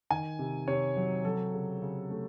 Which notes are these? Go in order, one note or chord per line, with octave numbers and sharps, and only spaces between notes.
D#3 G#5
C3
C3 C#5
F#3
F#3 A4
C#3
C#3
A3